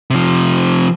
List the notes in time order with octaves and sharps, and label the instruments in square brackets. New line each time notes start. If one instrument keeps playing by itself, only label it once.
[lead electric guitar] C3 F3